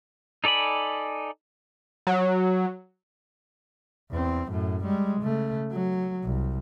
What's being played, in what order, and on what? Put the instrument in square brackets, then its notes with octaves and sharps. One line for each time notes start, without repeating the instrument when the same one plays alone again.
[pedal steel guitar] D#4 A4 D5 G#5 B5
[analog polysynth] F#3
[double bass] E2 C4
F#2 A2
G3 G#3
C#3 A3
F#3
C2